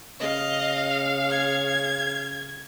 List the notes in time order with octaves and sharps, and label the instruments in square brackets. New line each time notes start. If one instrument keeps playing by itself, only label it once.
[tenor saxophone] C#3 [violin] D#5 [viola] F5
[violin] G#6